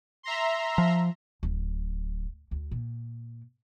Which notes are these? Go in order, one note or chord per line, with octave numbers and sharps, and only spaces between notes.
E5 A#5 C6
F3
D1
D2
A#2